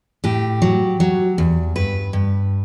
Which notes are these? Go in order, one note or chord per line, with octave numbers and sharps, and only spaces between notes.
A2 G4
F#3
F#3
E2
G2 B4
G2